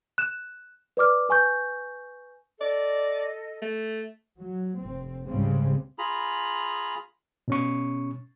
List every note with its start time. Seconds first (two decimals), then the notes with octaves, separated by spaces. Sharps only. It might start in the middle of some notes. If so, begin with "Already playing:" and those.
0.18 F#6 E7
0.97 B4 D5 D6 F6
1.29 B4 G#5 C#6 G6
2.60 A4 D5 D#5
3.62 A3
4.37 F#3
4.78 F1 C4
5.26 C#2 G#2 C#3 G3 G#3 C4
5.98 F4 G#4 A#5 B5
7.48 B2 C#4 C#6